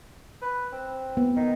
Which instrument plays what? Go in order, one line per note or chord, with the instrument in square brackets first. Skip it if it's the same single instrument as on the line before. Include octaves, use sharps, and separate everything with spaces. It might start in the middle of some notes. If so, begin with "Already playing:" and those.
[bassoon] B4
C4
[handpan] B3
[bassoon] D#3